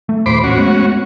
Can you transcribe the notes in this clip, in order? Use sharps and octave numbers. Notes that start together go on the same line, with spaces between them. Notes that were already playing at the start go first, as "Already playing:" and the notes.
A3
D#2 A#2 A3 C5 B5 D6
A1 C#4 F#4
G#3 A3 B3